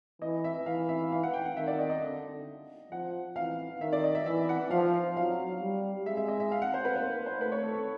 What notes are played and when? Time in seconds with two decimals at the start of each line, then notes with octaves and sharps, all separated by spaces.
0.22 E3 D#5
0.44 E5
0.66 E3 F5
0.89 E5
1.12 F5
1.23 F#5
1.33 G5
1.45 F#5
1.57 D#3 E5
1.67 D5
1.79 D#5
1.90 D#5
2.01 D3
2.92 F3 F#5
3.36 E3 F5
3.81 D#3 E5
3.93 D5
4.04 D#5
4.15 E5
4.26 E3 E5
4.49 F#5
4.71 F3 F5
5.16 F#3 F5
5.61 G3
6.06 G#3 E5
6.17 E5
6.28 D#5
6.40 E5
6.52 F5
6.62 F#5
6.74 C5
6.85 B4
6.95 A#3 C5
7.26 C5
7.40 A3 B4
7.52 C#5
7.63 A4
7.74 A4